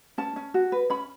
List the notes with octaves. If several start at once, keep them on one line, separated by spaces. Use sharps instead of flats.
C#4 A5
C#4
F#4
B4
C#4 B5